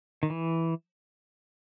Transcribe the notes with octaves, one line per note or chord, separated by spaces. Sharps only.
D#3
E3